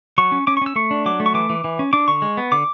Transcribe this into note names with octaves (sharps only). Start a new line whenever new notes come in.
F#3 C#6
C#4
C#4 D6
C#6
C#4 E6
A3 C#6
D4
F#3 D6
A3
C#6
E3 D6
E3
E3
C#4
D4 D6
D3 C#6
G#3
B3
D3 D6